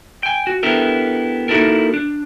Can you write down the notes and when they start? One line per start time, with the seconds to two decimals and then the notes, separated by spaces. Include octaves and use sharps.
0.23 G5 G#5
0.47 F#4
0.63 B3 D4 E4 G4 A4 A#4
1.48 A#3 D#4 E4 F#4 A4 A#4
1.94 D4